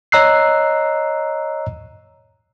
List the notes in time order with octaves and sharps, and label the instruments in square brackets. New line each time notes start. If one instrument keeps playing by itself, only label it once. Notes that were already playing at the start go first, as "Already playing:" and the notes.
[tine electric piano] C#5 D#5 A#5 E6 F#6 C7